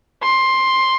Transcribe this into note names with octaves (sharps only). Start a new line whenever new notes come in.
C6